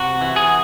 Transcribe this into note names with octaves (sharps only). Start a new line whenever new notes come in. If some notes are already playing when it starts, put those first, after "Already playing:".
Already playing: C3 F#4
E3
G#4